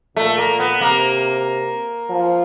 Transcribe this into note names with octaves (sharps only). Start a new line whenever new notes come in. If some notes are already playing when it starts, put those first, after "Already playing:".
A#2 A3
A#3
A#2
B3
C3 A#3
F3